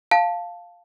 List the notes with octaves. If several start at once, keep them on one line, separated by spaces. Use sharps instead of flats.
F5 A5